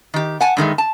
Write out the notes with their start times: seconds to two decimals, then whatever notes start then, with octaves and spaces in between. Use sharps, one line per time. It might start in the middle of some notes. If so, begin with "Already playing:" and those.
0.14 D#3 G4
0.41 F#5 G#5 A5
0.57 G2 D#3 G#3 A3
0.78 A5